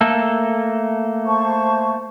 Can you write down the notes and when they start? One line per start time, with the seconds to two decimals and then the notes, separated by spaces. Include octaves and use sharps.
0.01 A3 A#3 A4
1.27 C5 A5 C#6